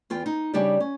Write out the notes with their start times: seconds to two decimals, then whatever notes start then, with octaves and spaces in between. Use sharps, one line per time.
0.10 E2 F4 G5
0.26 D#4
0.54 C#3 G3 D4 D#4 G4 D5
0.80 C#4